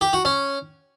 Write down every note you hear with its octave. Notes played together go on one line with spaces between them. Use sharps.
G4
F#4
C#4